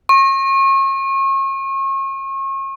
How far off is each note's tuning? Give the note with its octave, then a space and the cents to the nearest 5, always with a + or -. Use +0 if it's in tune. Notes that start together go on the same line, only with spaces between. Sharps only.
C#6 -35